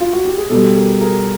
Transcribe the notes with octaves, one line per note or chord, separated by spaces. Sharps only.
F4
F#4
G4
G#4
B2 G3 G4 A4
G#4 A#4
G#4 A#4